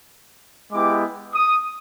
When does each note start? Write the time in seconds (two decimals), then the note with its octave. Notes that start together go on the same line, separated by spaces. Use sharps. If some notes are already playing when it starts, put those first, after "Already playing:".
0.71 G#3 B3 E4 G4 D6
1.33 D#6